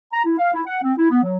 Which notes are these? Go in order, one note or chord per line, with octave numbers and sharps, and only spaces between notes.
A#5
E4
F5
E4
F#5
C4
E4
B3
F#3